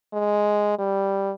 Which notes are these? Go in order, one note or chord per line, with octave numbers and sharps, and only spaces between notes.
G#3
G3